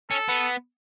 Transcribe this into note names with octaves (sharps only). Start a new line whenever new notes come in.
C#4 A4
B3